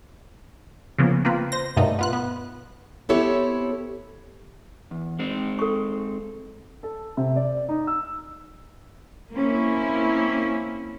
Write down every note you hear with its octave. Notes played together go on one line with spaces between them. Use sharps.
C#3 F3 A#3 B3
A#3 C4 F4 B4
C5 A#6
G2 B2 A3 A#3 D#4
B3 F4 F#6
B3
B3 C4 E4 G4 A4 C#5
E2
G#3 C4 D#4
A4 C#6
A4
C3
D5
D#4
E6
A#3 C4 C#4 E4